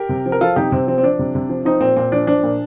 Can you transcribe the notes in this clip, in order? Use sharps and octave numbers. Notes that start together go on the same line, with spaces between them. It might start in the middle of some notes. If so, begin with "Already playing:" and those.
Already playing: G4 A#4
C3
F3
A#4
F3 F4 A4
C3 D#4 G4
C3 C4
F3 C4
C4
F3 D4
C3
C3
F3
F3 C4 D#4
A#2 C4
A#2 C4
F3 D4
F3 D4
A#2